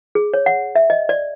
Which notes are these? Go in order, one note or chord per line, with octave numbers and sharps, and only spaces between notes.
G#4
C#5
F#5
E5
D#5
D5